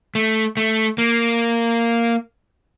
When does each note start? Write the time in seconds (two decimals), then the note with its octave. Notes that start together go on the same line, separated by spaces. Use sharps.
0.15 A3
0.57 A3
0.98 A#3